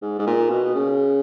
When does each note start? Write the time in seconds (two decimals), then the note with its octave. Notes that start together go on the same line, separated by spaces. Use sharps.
0.02 G#2
0.19 G#2
0.27 A#2
0.50 B2
0.75 C#3